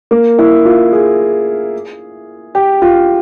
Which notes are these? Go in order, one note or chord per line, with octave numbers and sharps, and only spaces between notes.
A#3
E4
F4
G#4
G4
F4